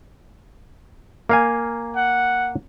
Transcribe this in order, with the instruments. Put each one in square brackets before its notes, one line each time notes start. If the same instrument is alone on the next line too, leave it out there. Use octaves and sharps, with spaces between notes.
[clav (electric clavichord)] A#3 F5 G#5
[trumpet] F#5